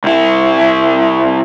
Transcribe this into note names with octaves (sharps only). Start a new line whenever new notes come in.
C2 E4